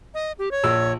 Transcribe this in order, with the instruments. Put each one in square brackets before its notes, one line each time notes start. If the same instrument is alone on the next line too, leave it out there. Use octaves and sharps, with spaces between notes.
[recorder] D#5
G4
C#5
[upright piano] A#1 E6